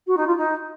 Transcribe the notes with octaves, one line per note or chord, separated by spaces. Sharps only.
F#4
D#4
F4
D#4